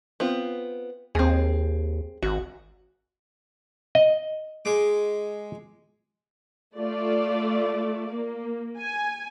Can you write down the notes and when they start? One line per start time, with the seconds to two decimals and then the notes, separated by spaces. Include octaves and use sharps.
0.20 B3 C4 F4
1.15 D#2 C4 G#4
2.23 G#1 F#4
3.95 D#5
4.65 G#3 D6
6.77 A3 F4 D5
8.12 A#3
8.78 G#5